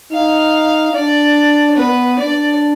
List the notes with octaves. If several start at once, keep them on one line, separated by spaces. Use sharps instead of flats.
D#4 F5
D4 D5
B3 B4
D4 D5